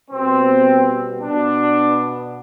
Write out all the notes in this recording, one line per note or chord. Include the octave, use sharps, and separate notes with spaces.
B2 G3 B3 C4
B2 B3 D4